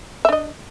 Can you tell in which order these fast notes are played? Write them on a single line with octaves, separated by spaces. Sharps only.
E5 D4 D#5